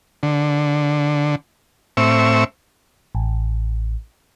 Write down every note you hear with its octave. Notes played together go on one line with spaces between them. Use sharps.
D3
A2 C4 E5 C#6 E6
A1